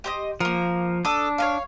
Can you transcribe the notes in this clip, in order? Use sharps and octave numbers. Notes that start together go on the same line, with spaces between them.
G4 C5 D#5
F3 A#3 A#4
D4 A4 D#6
C#5 D#5 F5